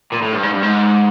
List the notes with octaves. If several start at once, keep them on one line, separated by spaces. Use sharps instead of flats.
A#2
A2
G2
G#2
G2
G#2